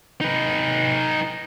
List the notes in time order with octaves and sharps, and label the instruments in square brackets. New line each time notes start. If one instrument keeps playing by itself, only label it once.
[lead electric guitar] D#4 B4